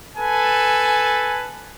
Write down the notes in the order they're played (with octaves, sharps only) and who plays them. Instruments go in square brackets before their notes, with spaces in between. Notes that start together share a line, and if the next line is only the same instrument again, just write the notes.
[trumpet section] A4 B4 G#5 A5